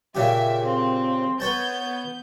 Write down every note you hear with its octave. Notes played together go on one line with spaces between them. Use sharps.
A#2 C#3 G4 E5
C4
B3 B4 C#5 A5 G6